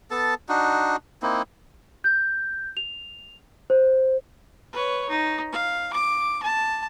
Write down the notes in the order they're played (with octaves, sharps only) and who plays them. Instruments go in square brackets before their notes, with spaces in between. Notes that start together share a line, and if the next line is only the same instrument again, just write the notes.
[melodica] B3 A4 A5
D4 D#4 F#4
A#3 C4 D#4 E4
[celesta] G6
F7
C5
[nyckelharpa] B4 C#5
D#4
F5
D6
A5